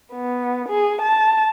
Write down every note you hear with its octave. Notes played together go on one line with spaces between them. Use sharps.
B3
G#4
A5